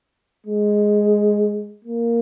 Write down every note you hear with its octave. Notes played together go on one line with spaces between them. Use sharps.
G#3
A#3